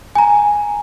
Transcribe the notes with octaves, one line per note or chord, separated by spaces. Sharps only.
G#5 A#5